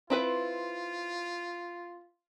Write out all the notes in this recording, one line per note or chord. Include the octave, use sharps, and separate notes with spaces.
C4 E4 F4 B4